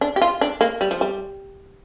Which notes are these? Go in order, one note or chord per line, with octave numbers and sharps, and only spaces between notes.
D4
G4
F4
D4
A#3
G3
F3
G3